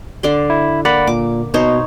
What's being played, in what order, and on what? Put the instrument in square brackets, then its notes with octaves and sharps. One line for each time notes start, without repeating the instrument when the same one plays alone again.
[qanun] D3 D5 C6
[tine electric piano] E4
[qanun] A#3 [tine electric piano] D5 F#5 B5
[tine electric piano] A#2 [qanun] D6
[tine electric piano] B2 [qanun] D#4 C5 C#5